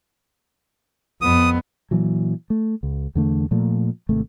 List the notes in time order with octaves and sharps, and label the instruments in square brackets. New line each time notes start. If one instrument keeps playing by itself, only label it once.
[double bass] F2 B3 [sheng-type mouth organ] D#6
[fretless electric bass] A#2 E3 F#3
A3
C#2
E2 D3 A3
A#2 F3 A3
G#1 C3 A3